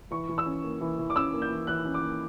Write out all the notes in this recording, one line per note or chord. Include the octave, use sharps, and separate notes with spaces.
E3 C#6
E3
E6
C#4
A#3
E3
E3
D6
C#4 E6
A#3
G6
E3
E3 F#6
C#4
D6
A#3